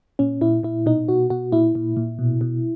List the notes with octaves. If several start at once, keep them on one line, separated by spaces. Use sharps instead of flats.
A#2 C#4
A#2 E4
A#2 E4
B2 D#4
B2 F#4
B2 F#4
A#2 E4
A#2
A#2
B2
B2